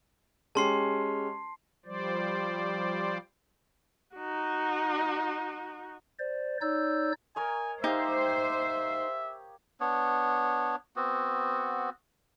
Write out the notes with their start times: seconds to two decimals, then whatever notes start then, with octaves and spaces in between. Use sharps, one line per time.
0.55 G#3 C#4 G4 A5 C6 C7
1.86 F3 G3 C5 D5
4.16 D#4 F#4
6.19 C5 D5
6.61 D#4 C#5 D5 E6 G6
7.36 A#4 C#5 D#5 G#5
7.84 D#4 G4 C5 E5 F5
9.80 B3 D4 C#5
10.96 B3 C4 F#4